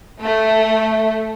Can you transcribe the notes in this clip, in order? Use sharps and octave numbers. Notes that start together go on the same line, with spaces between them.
A3